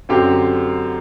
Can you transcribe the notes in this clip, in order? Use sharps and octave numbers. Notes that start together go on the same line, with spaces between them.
F#2 D3 F#3 C4 G4